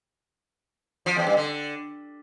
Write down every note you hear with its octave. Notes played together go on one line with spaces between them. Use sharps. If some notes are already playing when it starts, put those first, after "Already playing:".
F3
E2
G2
D3